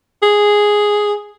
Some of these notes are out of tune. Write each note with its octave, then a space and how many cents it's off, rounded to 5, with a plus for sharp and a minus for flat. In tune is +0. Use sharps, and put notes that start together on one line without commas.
G#4 +0